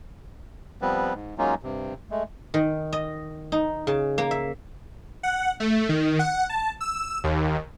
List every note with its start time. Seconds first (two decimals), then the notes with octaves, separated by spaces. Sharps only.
0.82 F3 G3 B3 C4 B4
1.14 G#2
1.38 F#3 G#3 A#3 C#4 D#4 F4
1.63 G2 C3
2.11 G#3 A3
2.54 D#3
2.93 D#5
3.52 D#4
3.87 C#3
4.18 A#3
4.31 E5
5.23 F#5
5.60 A3
5.89 D#3
6.19 F#5
6.49 A5
6.80 E6
7.24 D#2